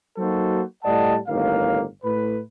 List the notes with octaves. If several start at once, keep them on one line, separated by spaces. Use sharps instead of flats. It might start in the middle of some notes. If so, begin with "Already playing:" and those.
F#3 A#3 D#4 F#4 A4 C5
A2 G3 D5 D#5 F#5 A5
G1 A2 D#3 A#3 F5
A2 B4